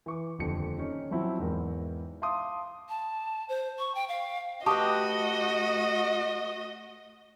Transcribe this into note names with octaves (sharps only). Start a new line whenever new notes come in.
E3 C#6 D6
D#1 F2 D3 C#7
C#4 D#4
F3 F#3 C4 E4
E2 G#2 A#4 G5
E5 F5 A5 C6 D6 D#6
A5
C5
C#6
G5
F5
A3 F#4 G4 B4 D#5 A5 C#6 D#6